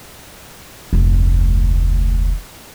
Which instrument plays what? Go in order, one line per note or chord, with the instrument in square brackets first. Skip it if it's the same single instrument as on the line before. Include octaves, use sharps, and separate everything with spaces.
[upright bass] F1 D2